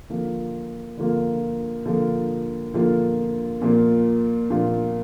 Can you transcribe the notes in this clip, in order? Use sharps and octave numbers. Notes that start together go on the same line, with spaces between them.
D3 F3 A#3 F4
D3 F3 A#3 F4
D3 F3 A#3 F4
D3 F3 A#3 F4
A#2 F3 A#3 F4
A#2 F3 A#3 F4